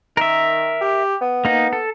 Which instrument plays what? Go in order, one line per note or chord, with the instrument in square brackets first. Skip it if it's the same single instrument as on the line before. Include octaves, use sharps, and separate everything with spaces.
[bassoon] D#3 [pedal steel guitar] A#4 E5
[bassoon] G4
B3
[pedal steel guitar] A#3 D#4
A4